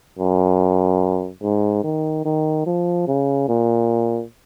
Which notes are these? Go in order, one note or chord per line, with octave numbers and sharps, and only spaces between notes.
F#2
G#2
D#3
D#3
F3
C#3
A#2